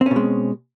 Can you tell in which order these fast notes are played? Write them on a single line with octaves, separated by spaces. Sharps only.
C4 C#4 B2 G#3